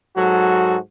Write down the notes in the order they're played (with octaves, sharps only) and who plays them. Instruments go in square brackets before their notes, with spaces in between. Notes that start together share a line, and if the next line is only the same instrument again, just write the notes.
[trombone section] G#2 F#3 F#4 A4